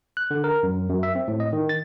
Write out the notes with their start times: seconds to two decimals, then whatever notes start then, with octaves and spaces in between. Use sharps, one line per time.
0.17 F#6
0.31 D3
0.44 A#4
0.63 F#2
0.89 F#2
1.03 E5
1.15 C4
1.28 A2
1.40 D#5
1.53 D#3
1.69 A6